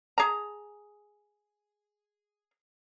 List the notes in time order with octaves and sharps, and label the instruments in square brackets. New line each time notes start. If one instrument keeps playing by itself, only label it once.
[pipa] G#4 A#5